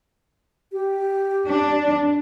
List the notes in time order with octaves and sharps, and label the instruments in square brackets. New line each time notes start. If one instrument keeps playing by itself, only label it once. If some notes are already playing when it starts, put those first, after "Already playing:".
[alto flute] G4
[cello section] D4